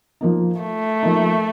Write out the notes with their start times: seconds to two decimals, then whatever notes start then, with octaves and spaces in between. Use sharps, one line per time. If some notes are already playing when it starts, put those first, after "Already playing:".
0.21 F3 A#3 D#4
0.61 A3
1.03 F3 A#3 D#4